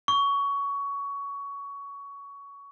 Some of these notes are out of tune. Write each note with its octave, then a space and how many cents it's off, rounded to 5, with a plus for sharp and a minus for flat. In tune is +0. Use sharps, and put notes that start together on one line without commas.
C#6 +20